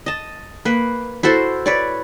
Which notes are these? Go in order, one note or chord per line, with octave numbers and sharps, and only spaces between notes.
D#5 A5
A#3 B4
E4 F#4 A4 C5
B4 C#5 D5